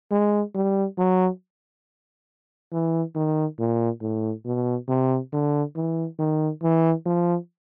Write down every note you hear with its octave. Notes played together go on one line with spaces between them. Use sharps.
G#3
G3
F#3
E3
D#3
A#2
A2
B2
C3
D3
E3
D#3
E3
F3